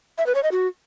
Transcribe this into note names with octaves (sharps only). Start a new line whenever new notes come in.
E5
B4
C#5
D#5
F#4